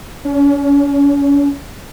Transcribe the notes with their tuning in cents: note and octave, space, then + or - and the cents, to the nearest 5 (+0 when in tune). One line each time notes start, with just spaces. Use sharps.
C#4 +35